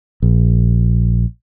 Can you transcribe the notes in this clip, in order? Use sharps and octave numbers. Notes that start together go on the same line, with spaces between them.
A#1